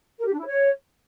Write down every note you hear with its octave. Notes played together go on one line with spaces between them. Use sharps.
A#4
G4
D4
E4
C#5